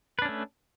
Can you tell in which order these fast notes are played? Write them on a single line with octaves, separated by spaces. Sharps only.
B4 D4 C#4 A3